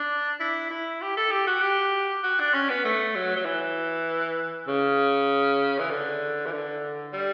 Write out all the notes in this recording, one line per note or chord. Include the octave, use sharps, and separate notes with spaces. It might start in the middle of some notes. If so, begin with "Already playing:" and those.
Already playing: D4
E4
E4
G4
A4
G4
F#4
G4
F#4
D4
C#4
B3
A3
F#3
F#3
E3
C#3
E3
D3
E3
D3
G3